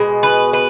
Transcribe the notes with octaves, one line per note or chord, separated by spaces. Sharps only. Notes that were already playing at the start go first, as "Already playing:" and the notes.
Already playing: B2 G#3
B4
B4